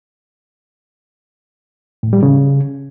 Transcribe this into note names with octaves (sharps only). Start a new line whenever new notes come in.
A2
G3
C#3